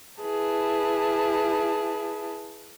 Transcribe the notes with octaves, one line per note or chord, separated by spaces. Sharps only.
E4 G#4 B4 A5